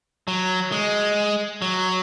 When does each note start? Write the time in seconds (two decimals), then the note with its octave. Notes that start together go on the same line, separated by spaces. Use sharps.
0.28 F#3
0.72 G#3
1.62 F#3